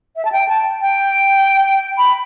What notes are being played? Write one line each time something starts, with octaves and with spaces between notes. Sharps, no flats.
E5
A5
G5
A5
G5
B5